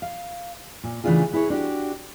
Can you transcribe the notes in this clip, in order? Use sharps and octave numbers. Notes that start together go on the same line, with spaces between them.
F5
A#2
C#3 E3 A3 D4 F4 G#4
B3 E4 G#4 B4 C#5
D4 F#4 G4